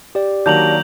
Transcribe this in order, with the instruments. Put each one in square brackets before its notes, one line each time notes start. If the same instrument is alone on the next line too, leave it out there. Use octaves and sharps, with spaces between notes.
[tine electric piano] G4 D5
[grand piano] D#3 F#3 A#3 [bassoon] D4 [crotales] G6 F7 F#7